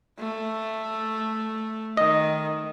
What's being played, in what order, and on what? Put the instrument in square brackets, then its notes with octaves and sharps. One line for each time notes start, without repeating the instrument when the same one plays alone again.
[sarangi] A3
[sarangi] D#3 [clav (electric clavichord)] D#5